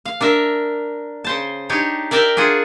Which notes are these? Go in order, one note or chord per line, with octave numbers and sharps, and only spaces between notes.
F5
D4 A#4 E5
C#3 C5 A5
D4 D#4 G4 C#5
A#4 D5 E5 G5 A5 A#5
D4 F4 G#4 F#5